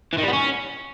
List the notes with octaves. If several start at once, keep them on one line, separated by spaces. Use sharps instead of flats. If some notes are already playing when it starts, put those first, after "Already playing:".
E3
D#3
G3
B3
C#4